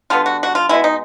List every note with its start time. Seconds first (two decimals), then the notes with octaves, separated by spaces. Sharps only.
0.10 D3 G3 B3 F4
0.26 F#4
0.43 F#4
0.55 F4
0.69 B2 G#3 B3 E4
0.84 D#4